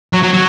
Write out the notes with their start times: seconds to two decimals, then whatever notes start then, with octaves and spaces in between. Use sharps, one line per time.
0.13 F#3
0.23 F#3
0.33 F#3